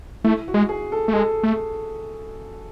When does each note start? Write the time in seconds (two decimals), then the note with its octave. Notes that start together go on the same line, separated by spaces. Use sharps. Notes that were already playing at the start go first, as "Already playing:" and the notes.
0.24 A3 E4
0.48 F#4
0.54 G#3
0.69 G#4
0.92 A4
1.08 A3
1.13 G#3 A4
1.43 A3